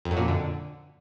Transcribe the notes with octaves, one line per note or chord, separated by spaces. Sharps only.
F2
F#2
A#2
F2
D3